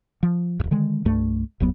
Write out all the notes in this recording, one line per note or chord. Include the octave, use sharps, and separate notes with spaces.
F3
D#1 E2
D3 D#3 G#3
C2 G2 A3
F#1 D#2 F#3 B3